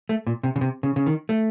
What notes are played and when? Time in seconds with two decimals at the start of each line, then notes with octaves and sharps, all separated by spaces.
0.09 A3
0.27 A#2
0.43 C3
0.56 C#3
0.61 C3
0.83 C#3
0.96 C#3
1.06 D#3
1.29 A3